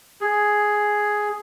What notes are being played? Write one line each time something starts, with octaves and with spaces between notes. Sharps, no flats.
G#4